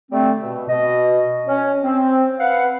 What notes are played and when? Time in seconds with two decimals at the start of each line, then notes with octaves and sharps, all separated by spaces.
0.11 D3 G3 A3 C4
0.42 B2
0.68 B2 D#5
1.46 C#4
1.83 C4
2.40 B4 F5 F#5